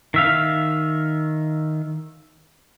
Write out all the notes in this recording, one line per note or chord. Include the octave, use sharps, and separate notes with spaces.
D#3 E5 F5